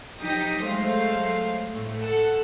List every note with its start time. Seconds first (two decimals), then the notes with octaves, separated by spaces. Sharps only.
0.20 F3 F#3 D#4 G4 D#6 A#6
0.64 F#3 G#3 A3 C5 F5
1.72 A2 A3
2.01 A4 F#5 E6